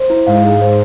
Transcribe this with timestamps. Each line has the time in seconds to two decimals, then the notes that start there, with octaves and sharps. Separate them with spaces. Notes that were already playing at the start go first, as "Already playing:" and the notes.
Already playing: C5
0.10 E4
0.27 G#2 F5
0.44 G#4
0.61 C5